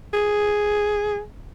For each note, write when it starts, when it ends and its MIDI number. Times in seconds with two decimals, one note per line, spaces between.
0.14 1.21 68